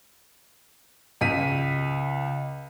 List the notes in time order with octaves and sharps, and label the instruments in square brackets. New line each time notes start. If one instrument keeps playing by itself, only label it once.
[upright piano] C#2 B6 D#7